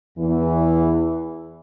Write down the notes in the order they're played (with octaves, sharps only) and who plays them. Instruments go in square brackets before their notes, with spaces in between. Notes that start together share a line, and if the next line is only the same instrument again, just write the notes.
[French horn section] E2 E3